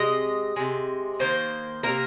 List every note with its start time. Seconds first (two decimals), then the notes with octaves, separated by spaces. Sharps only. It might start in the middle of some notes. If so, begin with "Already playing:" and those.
Already playing: C3 G#3 D#5
0.56 C3 G#3
1.20 D#3 A#3 C5
1.83 C3 D#3 A#3 A#4